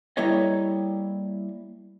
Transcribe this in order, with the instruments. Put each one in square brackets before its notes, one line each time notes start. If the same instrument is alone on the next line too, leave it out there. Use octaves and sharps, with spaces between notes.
[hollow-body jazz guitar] G3 A#3 E4 A4 C#5 D#5